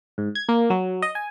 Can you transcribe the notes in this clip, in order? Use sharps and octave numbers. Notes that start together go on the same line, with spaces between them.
G#2
G#6
A#3
F#3
D#5
G#5